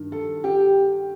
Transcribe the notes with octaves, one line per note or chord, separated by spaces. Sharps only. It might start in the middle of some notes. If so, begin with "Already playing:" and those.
Already playing: G2 D#3
A4
G4